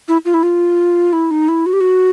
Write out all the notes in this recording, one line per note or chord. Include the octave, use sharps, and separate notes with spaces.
E4
F4
E4
F4
E4
D#4
E4
F#4
G4
F#4